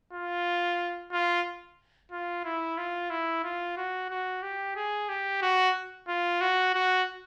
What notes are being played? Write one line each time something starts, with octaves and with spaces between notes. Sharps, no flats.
F4
F4
F4
E4
F4
E4
F4
F#4
F#4
G4
G#4
G4
F#4
F4
F#4
F#4